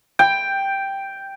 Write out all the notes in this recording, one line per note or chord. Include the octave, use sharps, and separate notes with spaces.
G5